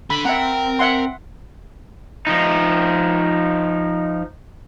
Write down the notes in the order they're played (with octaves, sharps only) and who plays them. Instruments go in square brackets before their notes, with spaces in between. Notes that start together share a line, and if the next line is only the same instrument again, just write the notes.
[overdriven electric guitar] D3 [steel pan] B5
[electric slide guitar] C4 G5 [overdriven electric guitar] A#4 [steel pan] E5 F#5
[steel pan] E5 F#5 C6
[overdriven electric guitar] F3 D#4